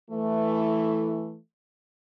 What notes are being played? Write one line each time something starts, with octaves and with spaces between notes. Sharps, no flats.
E3 A3